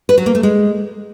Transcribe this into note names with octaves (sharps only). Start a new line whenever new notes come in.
B4
F#3
A#3
A3
G#3